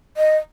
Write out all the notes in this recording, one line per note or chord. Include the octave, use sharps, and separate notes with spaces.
D#5